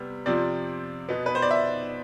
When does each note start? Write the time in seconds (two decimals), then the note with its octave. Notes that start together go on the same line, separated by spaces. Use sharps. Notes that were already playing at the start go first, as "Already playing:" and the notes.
Already playing: C3 G3 B3
0.26 C3 F3 C4 D5
1.09 B2 B3
1.26 B4
1.35 C5
1.42 D5
1.51 E5